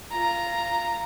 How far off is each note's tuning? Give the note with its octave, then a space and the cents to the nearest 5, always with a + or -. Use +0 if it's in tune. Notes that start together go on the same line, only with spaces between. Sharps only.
F4 -15 A#5 +0